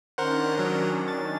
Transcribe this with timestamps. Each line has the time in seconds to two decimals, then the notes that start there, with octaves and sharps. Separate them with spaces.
0.18 D#3 C#4 D4 A#4 C5 F#5
0.58 F#3 A#4
1.08 A6